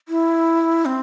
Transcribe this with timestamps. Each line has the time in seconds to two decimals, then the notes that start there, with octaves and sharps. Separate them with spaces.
0.09 E4
0.85 C4